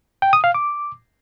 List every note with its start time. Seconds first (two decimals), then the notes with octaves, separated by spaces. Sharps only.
0.22 G5
0.33 D#6
0.44 F5
0.55 D6